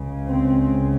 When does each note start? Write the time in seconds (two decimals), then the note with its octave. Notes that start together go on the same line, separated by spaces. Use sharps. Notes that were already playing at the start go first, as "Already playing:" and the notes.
Already playing: C#2 C#3
0.27 C4